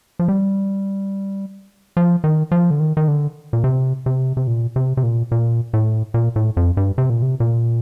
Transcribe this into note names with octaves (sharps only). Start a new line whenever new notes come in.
F3
G3
F3
D#3
F3
D3
D#3
D#3
D3
A#2
C3
C3
C3
A#2
C3
C3
A#2
A#2
A2
A#2
A2
F2
G2
C3
A#2
C3
A#2